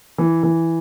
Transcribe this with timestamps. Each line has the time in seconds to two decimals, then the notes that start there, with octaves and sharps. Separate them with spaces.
0.18 E3
0.43 E3